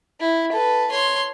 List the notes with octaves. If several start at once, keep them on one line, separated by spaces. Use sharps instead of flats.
E4
A4 B4
C#5 C6